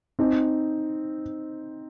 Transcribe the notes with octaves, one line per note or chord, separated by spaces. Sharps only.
C4 D#4